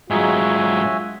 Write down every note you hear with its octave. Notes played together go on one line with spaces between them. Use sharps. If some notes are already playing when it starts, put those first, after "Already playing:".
G#2 F#3 G#3 F4 F#4 E5 G#5